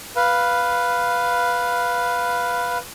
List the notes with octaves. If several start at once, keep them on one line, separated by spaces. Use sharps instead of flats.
B4 F5